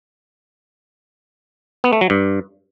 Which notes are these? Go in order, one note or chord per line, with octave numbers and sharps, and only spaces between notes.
B3
A3
F#3
G2